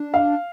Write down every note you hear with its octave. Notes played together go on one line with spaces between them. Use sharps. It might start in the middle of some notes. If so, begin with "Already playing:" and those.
Already playing: D4
F5